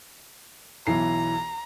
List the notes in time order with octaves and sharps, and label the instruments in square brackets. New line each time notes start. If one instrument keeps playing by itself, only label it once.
[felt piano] B1 E3 C7 [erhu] A#5